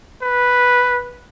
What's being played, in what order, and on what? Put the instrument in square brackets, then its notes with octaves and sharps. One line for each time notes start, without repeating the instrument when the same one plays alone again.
[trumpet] B4